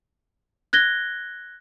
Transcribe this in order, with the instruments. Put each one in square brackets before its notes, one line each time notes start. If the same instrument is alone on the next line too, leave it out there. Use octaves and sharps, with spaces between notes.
[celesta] F#6 G#6 A#6 G7